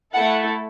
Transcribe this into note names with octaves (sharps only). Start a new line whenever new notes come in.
A3 E4 A4 F#5